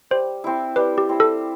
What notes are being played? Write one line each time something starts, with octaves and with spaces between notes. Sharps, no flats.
G3 C5
C4 E4
G3 B4
G4
C4 E4
A4